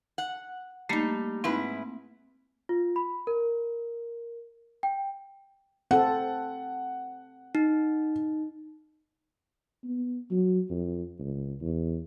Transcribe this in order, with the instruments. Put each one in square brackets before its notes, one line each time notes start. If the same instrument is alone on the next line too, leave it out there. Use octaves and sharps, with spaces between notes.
[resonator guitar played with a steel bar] F#5
[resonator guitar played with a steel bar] G3 D#4 [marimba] A3 A#3
[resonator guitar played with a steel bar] G#2 E4 B4 [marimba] C4
[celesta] F4
B5
A#4
G5
[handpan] C4 A4 [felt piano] F#5
[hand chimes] D#4
[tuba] B3
F#3
F2
C#2
E2